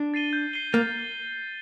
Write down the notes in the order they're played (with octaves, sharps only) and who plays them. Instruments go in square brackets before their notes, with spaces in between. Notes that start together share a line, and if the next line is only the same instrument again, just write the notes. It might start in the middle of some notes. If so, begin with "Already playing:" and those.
Already playing: [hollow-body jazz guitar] D4
[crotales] A6 C7 D#7 G7
G6
C7 D#7 G7
[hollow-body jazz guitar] A#3 [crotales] A6